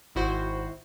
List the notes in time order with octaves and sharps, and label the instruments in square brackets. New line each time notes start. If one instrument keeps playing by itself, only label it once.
[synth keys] G#1 E4 F#4 C5